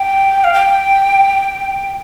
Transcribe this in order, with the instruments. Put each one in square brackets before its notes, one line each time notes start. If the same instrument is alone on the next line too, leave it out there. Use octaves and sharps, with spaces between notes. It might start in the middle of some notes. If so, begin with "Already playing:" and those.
Already playing: [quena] G5
F5
G5